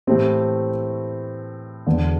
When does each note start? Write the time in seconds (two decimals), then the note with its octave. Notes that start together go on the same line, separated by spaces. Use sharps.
0.07 A2 E3 A3 C4 G4
1.87 E1 E2 D3